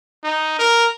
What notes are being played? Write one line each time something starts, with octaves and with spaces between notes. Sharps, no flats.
D#4
A#4